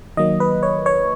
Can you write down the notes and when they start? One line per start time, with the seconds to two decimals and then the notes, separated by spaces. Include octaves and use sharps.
0.17 D#3 F#3 A#3 D#5
0.40 B4
0.63 C#5
0.86 C#5